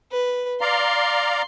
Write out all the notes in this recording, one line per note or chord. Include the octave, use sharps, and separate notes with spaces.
B4
D5 F5 A#5 C6